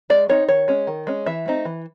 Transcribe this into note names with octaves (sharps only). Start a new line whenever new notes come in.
G#3 D5
C4 D#4 C#5
D#3 C#5
G#3 C#4
D#3
G#3 C#4
E3 E5
A3 C4 D#4
E3